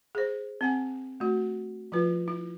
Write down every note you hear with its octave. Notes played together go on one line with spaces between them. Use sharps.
G#4 C5
C4 F#5 G#5
A3 F#4
F3 E4 F4 B4
E4